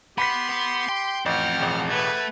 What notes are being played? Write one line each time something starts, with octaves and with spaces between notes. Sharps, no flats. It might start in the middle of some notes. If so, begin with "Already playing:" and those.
B3 G4 B4 B5 C6 B6
B3
G5
A1 F2 F#5 G5 F6
E1 A1
A3 B4 F#5 G#6